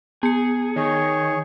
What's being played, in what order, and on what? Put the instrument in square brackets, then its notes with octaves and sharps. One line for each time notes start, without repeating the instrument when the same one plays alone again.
[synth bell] B3 C#7 [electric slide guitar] G#4
[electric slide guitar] D#3 [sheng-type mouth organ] G#4 C#5